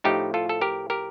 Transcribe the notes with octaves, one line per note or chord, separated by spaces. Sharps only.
A2 F3 A3 D#4 G4
F4 A4
A4
G4 A#4
G4 A#4